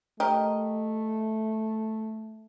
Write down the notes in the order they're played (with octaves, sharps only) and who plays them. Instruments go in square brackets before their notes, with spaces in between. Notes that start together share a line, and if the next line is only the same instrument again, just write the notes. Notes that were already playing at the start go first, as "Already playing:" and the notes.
[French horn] A3 [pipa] G4 A#4 D#5